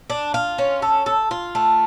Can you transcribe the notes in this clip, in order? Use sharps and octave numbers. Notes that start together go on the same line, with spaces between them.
D4
F4
C#4
A4
A4
F4
A3